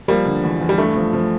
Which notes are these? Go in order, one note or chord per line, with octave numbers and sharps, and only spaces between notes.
F3 G3 A#3
D3
E2
E2
G3
G2 A3
F3
F3